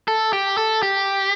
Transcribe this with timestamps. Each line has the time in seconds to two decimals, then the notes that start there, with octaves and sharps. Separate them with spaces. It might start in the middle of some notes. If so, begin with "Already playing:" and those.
0.08 A4
0.33 G4
0.57 A4
0.83 G4